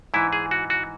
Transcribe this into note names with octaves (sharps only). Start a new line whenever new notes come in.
G#2 E3 E4
G#4
F#4
F#4